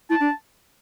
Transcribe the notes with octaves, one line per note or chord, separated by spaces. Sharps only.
E4 A5
D4